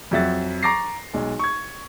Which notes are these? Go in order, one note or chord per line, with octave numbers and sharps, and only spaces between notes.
F2 F3 F#3 E5 F#5 A6
A#5 C#6 D6 A6 A#6 C7
B1 G#3
C#6 G#6